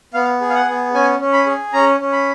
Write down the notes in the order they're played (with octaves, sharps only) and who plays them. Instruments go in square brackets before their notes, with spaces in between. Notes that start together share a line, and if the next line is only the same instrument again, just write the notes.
[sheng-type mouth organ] B3 F5
G#4
F5
F#5
B3
C#4 G#5
C#4
B5
G#4
C#4 A#5
C#4
B5